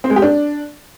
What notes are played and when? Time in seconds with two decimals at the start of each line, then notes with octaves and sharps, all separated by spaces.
0.04 C4
0.10 G#3
0.16 G4
0.22 D4